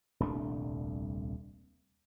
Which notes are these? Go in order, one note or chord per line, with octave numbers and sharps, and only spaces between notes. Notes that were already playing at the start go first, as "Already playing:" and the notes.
D#1 C2 A3 D4